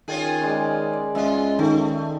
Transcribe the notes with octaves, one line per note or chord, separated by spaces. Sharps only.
D#3 C#4 F4 G#4 G5
C#3 G#3 D5
D5
C#2 G#3 F4 D#5 E5
D#3 A3